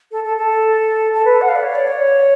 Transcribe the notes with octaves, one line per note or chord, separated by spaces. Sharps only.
A4
A4
A4
A4
B4
F#5
F5
D5
C#5
D5
C#5